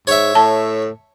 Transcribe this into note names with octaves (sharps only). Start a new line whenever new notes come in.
G#2 C#5 E5
A2 A5